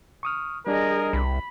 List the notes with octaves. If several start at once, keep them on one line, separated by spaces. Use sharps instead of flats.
C#6 D#6 F6
G3 D4 G#4 A#4 D#5
C2 B5